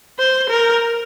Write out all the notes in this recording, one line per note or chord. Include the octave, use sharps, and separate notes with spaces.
C5
A#4